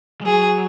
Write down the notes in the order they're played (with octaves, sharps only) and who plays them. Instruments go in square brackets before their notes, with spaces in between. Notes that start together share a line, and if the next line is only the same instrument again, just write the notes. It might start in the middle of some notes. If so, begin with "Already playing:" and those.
[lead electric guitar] G#3
[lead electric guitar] F#3 [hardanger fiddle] G#4